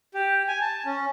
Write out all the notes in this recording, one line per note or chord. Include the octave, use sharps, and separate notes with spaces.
G4
G#5
A5
C#4